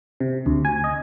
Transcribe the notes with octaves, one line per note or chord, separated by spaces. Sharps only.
C3
D2
G#5
D#5